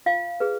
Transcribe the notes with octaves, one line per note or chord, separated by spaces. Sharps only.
F4 F5
G#4 B4